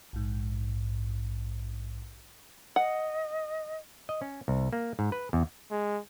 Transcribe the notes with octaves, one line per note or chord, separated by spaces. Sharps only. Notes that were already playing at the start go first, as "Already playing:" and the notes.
A#1 G#2
D#5 F#5
D#5
C#4
C2
A#3
G#2
B4
E2
G#3